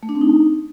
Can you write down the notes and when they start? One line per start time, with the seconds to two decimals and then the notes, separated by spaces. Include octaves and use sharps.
0.03 A3
0.09 D4
0.15 C4
0.21 D#4